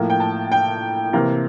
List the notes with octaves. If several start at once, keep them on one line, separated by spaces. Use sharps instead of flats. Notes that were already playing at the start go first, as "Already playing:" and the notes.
Already playing: A2 F3 A#3
G5
A5
G5
C3 E3 A#3